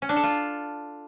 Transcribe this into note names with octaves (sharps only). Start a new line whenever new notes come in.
C#4
D4
A4
F4